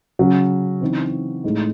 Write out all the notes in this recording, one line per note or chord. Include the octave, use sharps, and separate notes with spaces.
C#3 F#3 C#4
C#3 E3 C4 D#4
A2 G#3 D#4